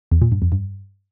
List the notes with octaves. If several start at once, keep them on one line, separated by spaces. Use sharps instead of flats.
E2
A#2
G2
F2
G2